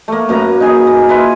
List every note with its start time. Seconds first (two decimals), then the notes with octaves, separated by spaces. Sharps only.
0.08 A3 A#3
0.29 F#2 A#3 B4 A#5
0.60 D#4 G#4 G#5
0.87 A#3
1.09 E4 F4 B4